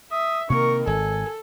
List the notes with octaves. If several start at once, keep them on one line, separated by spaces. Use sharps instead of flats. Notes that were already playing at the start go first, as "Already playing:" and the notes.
E5 D#6
C3 D#3 A#3 A#4 C#6
G#1 A4 G#5